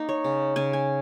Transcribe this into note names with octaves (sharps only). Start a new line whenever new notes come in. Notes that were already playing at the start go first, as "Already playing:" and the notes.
Already playing: A#3 D#4
C#5
C#3
C#3 G#5
G#5